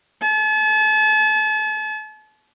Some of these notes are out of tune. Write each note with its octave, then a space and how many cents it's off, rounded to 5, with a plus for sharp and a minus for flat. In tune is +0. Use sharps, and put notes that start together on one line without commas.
A5 -40